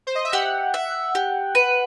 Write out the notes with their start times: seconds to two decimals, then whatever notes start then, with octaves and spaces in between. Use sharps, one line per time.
0.07 C5
0.15 D#5
0.25 E5
0.32 G4 F#5
0.74 E5
1.15 G4
1.55 B4